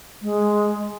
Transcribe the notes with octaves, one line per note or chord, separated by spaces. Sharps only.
G#3